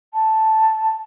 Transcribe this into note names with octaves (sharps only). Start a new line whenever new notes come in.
A5